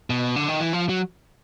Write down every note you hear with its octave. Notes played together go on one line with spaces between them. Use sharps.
B2
D3
D#3
E3
F3
F#3